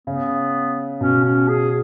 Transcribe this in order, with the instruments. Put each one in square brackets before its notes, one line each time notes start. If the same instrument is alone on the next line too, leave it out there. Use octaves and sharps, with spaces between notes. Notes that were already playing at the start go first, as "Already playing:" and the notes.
[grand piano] C#3 [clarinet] B3
[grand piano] B2 [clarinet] C#4
[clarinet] C#4
G#4